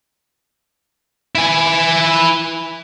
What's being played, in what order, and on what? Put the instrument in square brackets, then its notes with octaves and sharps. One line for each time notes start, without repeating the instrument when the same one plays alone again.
[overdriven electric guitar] E4 G#5